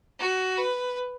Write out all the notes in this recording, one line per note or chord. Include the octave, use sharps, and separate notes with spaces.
F#4
B4